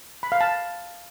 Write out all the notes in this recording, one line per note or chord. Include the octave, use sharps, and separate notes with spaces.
B5
F5
A5